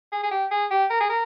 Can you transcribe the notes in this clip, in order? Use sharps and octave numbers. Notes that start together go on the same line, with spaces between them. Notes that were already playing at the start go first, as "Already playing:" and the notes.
G#4
G#4
G4
G#4
G4
A#4
G#4
A#4